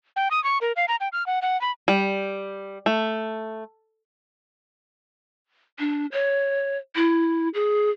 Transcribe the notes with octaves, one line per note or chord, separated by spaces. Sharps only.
G5
D#6
C#6
A#4
F5
A#5
G5
F6
F#5
F#5
B5
G3
A3
D4
C#5
E4
G#4